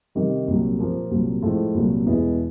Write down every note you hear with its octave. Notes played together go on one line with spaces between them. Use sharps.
C3 D#3 G3
C2 A#2 F#3
A#2 F3 A#3
C2 A#2 F#3
A2 F3 G#3
C2 A#2 F#3
E2 B2 G#3 B3 E4